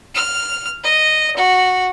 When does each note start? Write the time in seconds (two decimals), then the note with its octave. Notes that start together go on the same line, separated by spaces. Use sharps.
0.15 F6
0.84 D#5
1.37 F#4